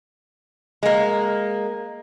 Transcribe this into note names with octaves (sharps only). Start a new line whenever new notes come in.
G#3 A#3